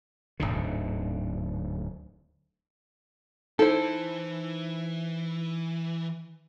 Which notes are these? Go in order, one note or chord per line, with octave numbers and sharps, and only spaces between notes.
D1 G1 G#2 D3
E3 D#4 E4 A4 C5